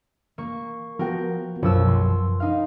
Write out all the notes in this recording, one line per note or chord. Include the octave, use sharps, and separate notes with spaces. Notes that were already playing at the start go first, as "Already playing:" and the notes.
A#3 C#6
F3 B3 F#4 A#4 G5
B1 F#2 F3 E6
C6
D#4 F5